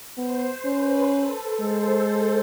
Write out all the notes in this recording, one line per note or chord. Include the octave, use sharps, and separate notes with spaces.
B3 C5
C#4 B4
A4
G#3 C5